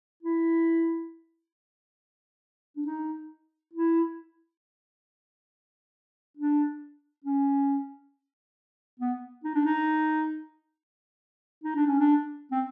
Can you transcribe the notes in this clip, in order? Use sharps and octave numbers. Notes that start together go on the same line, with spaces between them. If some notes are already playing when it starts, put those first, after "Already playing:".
E4
D4
D#4
E4
D4
C#4
B3
D#4
D4
D#4
D#4
D4
C#4
D4
C4